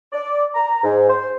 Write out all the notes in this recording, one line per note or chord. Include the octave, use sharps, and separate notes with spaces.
D5
A#5
G#2
C5